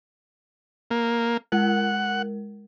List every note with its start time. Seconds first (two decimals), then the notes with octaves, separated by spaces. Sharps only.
0.91 A#3
1.52 G#3 A#4 F#5